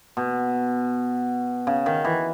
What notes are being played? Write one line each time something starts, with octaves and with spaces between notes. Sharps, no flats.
B2
C#3
D#3
E3